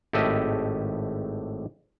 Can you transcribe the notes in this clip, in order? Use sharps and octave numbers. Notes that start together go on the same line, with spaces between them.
G#1 A2 G4 A4 D#5 E5